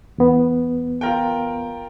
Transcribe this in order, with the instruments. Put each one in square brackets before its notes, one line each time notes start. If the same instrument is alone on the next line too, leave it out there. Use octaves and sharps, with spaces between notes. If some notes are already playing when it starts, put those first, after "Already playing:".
[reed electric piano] E2 B3
[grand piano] F4 A#4 G5